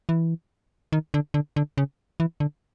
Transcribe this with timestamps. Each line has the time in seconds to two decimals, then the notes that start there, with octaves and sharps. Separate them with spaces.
0.09 E3
0.92 D#3
1.14 D3
1.34 D3
1.56 D3
1.77 C#3
2.20 E3
2.40 D3